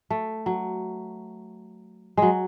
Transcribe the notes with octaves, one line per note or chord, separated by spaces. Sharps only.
A3
F#3
F#3 G#3